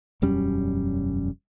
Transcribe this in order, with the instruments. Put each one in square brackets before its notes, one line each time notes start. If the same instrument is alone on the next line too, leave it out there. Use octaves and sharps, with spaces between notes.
[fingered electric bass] E1 F#2 G3 C#4